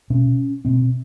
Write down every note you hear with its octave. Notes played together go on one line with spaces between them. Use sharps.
B2 C#4
B2 C4